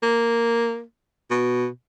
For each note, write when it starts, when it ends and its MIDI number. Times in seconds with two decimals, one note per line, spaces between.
0.02 0.83 58
1.30 1.67 47